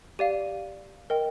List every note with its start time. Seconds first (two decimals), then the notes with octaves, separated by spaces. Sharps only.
0.19 G4 D5 F5 D#7
1.10 A#4 D#5 G5